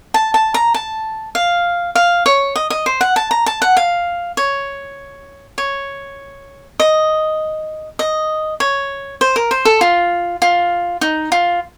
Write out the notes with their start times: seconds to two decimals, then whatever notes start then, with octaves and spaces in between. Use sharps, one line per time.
0.14 A5
0.34 A5
0.54 A#5
0.74 A5
1.35 F5
1.95 F5
2.26 C#5
2.56 D#5
2.70 D#5
2.86 C5
3.01 F#5
3.16 A5
3.31 A#5
3.46 A5
3.62 F#5
3.77 F5
4.37 C#5
5.58 C#5
6.80 D#5
7.99 D#5
8.60 C#5
9.21 C5
9.36 A#4
9.51 C5
9.65 A4
9.81 F4
10.42 F4
11.01 D#4
11.32 F4